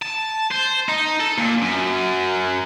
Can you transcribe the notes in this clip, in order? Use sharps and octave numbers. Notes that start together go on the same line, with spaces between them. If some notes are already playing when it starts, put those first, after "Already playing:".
A5
C5
D#4
A4
A#2
F#2